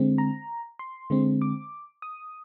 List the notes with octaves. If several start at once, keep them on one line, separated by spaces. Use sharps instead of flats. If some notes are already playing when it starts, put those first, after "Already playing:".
Already playing: D3 G#3 C4
A#5
C6
D3 G#3 C4
D6
D#6